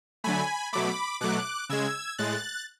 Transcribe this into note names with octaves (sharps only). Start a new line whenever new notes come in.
D3 F#3 A3 G#5 B5
B2 F#3 A3 B5 D6
B2 F#3 A3 D6 F#6
C#3 G#3 E6 G#6
A2 G#3 F#6 A6